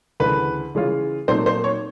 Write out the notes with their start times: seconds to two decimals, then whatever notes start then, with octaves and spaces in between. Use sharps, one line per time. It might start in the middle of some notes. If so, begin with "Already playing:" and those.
0.20 D2 C#3 E3 A3 B4
0.75 C#3 E3 G#3 C#4 F4
1.28 A#2 F#3 A3 C4 D#4 C5
1.46 C5
1.64 C#5